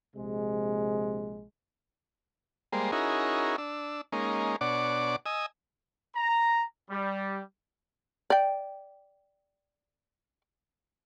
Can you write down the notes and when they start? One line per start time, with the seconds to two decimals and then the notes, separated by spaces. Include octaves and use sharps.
0.16 A#1 C3 G#3
2.73 G3 G#3 A#3 C5
2.92 C#4 D#4 E4 F#4 G#4 A#4
3.58 D4 E6
4.12 G#3 A#3 C#4 D#4
4.61 B2 D4 C#5 D5 F#5 D6
5.26 D#5 G#5 D#6 E6
6.16 A#5
6.91 G3
8.30 D5 G5